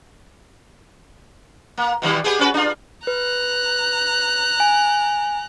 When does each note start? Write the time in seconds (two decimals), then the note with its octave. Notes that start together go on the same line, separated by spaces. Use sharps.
1.78 A#3
2.02 B2 D#3 G3
2.24 B3 G4 G#4
2.39 C#4 F#4 B4
2.54 D4 F4
3.07 B4 A#5 F#6
4.60 G#5